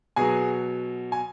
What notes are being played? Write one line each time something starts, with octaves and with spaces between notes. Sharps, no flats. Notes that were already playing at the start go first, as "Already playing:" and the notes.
B2 F#3 G#4 G#5
G#5